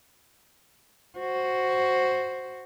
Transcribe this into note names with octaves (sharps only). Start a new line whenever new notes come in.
F#4 C5